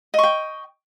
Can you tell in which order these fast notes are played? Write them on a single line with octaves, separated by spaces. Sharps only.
D#5 C#6 G5